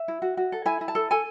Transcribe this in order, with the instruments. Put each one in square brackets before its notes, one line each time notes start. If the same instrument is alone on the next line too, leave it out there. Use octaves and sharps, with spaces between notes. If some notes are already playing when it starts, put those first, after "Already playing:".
Already playing: [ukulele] E5
E4
F#4
F#4
A4
E4 G#5
E4
A5
A4
A4 G#5